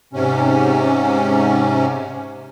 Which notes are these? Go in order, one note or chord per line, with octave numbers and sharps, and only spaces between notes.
G#2 C3 C#4